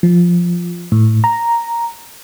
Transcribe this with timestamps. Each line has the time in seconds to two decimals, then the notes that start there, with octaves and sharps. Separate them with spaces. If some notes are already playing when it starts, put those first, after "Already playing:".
0.03 F3
0.92 A2
1.24 A#5